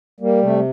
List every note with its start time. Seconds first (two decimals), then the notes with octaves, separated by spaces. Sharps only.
0.20 G3 A#3
0.42 C3 A3